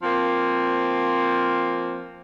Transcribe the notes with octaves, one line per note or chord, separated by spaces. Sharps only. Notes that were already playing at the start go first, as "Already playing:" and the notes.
F3 A#3 C4